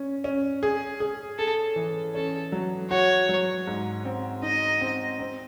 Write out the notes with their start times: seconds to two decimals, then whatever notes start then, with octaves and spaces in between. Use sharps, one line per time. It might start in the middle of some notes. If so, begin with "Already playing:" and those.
Already playing: C#4
0.24 C#4
0.63 G#4
1.00 G#4
1.38 G#4 A4
1.76 E3
2.14 C#4 A4
2.52 F#3
2.90 F#4 C#5
3.29 F#3
3.67 G#2
4.05 C4
4.43 D#4 D#5
4.81 C4
5.19 C4